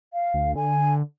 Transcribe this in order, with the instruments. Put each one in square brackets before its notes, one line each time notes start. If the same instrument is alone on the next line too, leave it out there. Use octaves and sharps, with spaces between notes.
[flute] F5
[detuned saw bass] D2
[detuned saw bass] D3 [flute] G#5